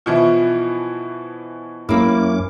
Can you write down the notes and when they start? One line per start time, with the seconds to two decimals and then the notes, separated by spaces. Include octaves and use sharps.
0.06 B2 E3 F3 F4 E5
1.89 F#2 A#3 C#4 E4 D6